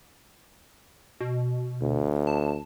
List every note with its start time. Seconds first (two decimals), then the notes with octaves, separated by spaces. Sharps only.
1.21 B2
1.82 D2
2.27 A5